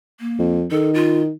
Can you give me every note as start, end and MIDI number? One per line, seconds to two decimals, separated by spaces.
0.20 0.55 58
0.39 0.66 41
0.71 1.31 51
0.71 0.90 69
0.94 1.21 65